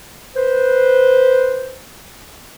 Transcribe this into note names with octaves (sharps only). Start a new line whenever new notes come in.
B4 C5